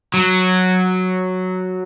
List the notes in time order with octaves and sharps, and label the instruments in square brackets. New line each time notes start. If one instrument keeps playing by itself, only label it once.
[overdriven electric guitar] F#3